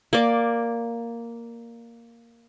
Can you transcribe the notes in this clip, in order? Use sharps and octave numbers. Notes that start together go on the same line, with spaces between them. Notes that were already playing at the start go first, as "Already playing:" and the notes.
A#3 D5